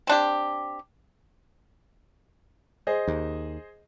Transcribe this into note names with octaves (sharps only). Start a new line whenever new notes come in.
C4 D4 G4
G#4 C5 D#5
D#2